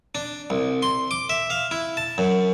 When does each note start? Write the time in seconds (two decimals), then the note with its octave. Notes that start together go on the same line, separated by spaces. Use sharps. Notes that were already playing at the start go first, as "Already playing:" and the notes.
0.15 D4
0.50 C2
0.82 C6
1.11 D6
1.30 E5
1.50 F5
1.71 E4
1.97 A5
2.18 F#2